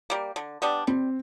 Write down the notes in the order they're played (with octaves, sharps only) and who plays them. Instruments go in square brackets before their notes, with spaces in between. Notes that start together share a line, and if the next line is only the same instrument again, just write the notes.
[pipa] G3 A#3
D3
G3 B3 D4
[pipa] G3 [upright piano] C4